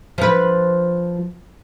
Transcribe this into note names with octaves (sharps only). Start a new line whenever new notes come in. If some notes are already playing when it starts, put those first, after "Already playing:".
F3 B4